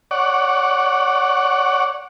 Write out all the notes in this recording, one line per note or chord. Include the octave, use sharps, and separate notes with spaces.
C#5 D5 F#5